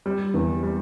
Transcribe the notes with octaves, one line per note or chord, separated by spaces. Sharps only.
G3
E2
G3